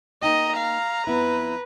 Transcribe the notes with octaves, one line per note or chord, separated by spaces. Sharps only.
A#3 D#4 D#5 G5 A#5
F5
F2 B3 E4 B4